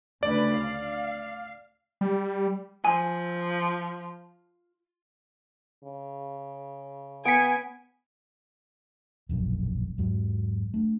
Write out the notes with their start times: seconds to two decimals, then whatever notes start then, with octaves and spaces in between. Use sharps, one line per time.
0.23 D2 C#3 B4 D5
0.55 F5
2.01 G3
2.85 F3 G#5
5.84 C#3
7.25 B3 G#5 B6 C#7 D7
9.29 E1 A#1 F#2
9.98 E2 G#2 F#3
10.74 A3 D4